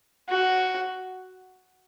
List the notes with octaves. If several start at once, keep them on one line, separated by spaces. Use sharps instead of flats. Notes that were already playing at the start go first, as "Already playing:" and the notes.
F#4